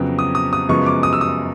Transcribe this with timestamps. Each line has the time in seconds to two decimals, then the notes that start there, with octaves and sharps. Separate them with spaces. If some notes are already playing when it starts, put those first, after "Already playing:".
Already playing: F2 C#3 F#3 B3
0.19 D#6
0.35 D#6
0.53 D#6
0.69 F#2 C#3 F3 G#3 B3 C#6
0.86 D6
1.03 D#6
1.13 E6
1.21 D#6